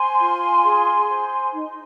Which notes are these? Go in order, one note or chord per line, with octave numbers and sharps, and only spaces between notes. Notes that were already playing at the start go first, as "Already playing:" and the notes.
Already playing: C5 G#5 C6
F4
G#4
C5
D#4